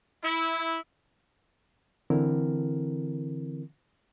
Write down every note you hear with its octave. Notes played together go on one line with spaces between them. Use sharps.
E4
D3 E3 C4 E4 A#4